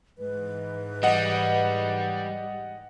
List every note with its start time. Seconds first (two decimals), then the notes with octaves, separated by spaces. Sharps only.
0.18 G#2 E3 B4
1.03 G3 D#5 F#5